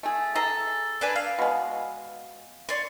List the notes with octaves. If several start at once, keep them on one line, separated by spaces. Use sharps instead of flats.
A3 G#4
G#4 A4 A#5
D4 B4 G#5
F5
B2 G#3
C#5 D5 C6